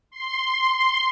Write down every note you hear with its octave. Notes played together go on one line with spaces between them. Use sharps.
C6